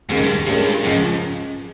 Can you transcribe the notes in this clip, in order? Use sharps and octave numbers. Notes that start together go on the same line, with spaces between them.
D#2 G#2 C#3 G#3
G2
G2 A#2 G#3 C#4 G4
C#2 G#2 C#3 F3